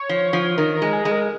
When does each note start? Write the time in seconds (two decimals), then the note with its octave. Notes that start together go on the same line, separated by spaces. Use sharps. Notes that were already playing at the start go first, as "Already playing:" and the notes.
Already playing: C#5
0.09 F3
0.33 F3
0.57 D#3 A#4
0.75 A#4
0.82 G#3
0.93 G#4
1.05 G#3
1.11 A#4